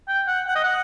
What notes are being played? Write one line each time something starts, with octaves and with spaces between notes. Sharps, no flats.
G5
F#5
F#5
D#5
F#5